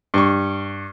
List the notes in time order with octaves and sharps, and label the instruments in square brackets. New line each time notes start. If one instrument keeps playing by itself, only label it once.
[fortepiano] G2 C#6